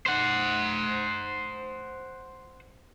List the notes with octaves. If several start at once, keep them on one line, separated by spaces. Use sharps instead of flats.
C5 F#5